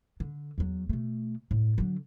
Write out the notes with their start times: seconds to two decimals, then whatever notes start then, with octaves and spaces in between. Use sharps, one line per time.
0.20 D3
0.58 E2 F#3
0.89 B2 A3
1.51 A2
1.78 D3 F#3